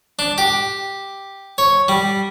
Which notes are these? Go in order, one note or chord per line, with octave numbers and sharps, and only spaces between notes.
D4
G4
C#5
G3